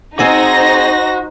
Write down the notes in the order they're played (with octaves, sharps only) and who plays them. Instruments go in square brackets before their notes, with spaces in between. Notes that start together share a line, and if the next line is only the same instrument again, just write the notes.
[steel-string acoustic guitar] C4 G#4 D#5 [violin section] D#4 C5 A#6 [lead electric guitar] F#4